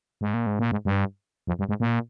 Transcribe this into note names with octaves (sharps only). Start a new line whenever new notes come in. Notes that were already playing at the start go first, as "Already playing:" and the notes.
G#2
A#2
G#2
A#2
G#2
G2
F2
G2
G#2
A#2